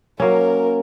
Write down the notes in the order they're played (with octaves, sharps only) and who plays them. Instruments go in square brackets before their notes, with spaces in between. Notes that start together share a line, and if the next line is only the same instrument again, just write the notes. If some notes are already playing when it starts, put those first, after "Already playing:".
[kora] F#3 A#3 C#4 [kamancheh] A#4